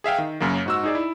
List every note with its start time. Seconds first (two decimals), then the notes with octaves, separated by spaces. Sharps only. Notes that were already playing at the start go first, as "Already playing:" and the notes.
0.04 G#4 E5 F5 G5
0.18 D#3
0.40 F#2 C#3 F#3 A#3
0.66 G#2 F#4 E6
0.83 D#4 G#4 D5
0.95 E4